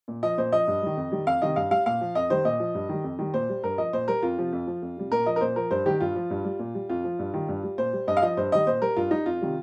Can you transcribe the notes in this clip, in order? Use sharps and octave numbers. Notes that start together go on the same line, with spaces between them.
A#2
F3 D#5
A#2 C5
F3 D#5
G2
D#3 G3
F2
D#3 G3
F2 F5
C3 D#3 G3 D#5
G2 F5
G3 F5
A#2 F5
F3
F2 D#5
D#3 G3 C5
A#2 D#5
F3
G2
D#3 G3
F2
D#3 G3
A#2 C5
G3
G2 A#4
F3 D#5
A#2 C5
G3 A#4
F2 F4
C3 F3
F2
F3
F2
C3 G3
A#2 A#4
F3 D#5
A#4
A#2 C5
F3 A#4
G2 C5
D#3 G3 G4
G2 F4
F3
G2
G3
A#2
G3
F2 F4
F3
G2
D#3 G3
G2
G3
A#2 C5
G3
G2 D#5
F5
F3 D#5
G2 C5
D#3 G3 D#5
A#2 C5
G3 A#4
G2 F4
G3 D#4
F2 F4
C3 D#3 G3